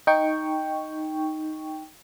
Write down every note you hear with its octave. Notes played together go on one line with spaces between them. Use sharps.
D#4 G5 C#6